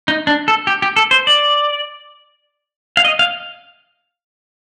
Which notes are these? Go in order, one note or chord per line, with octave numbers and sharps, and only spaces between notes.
D#4
D4
A4
G4
G4
A4
C5
D5
F5
D#5
F5